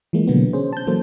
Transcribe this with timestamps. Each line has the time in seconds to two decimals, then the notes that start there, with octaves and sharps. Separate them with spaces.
0.13 E3 F3 G#3 A#3
0.27 B2 D3 F#3 A#3 B3
0.53 C#4 G#4 C5
0.73 A5 G6
0.87 E3 F#3 A#3 A4 C5